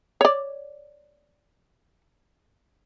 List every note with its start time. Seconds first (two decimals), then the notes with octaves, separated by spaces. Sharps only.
0.21 C#5 D5